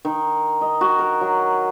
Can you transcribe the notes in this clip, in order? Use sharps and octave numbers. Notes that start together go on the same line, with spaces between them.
D#3
D#5
F#4
A#4
F#3